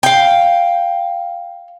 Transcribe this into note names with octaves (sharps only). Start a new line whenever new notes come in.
F5 G5